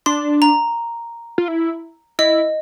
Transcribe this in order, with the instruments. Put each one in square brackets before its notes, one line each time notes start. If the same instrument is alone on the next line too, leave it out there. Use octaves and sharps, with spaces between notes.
[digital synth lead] D4 [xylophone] C6
[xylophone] A#5
[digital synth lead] F4
E4
[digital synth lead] E4 [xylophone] D#5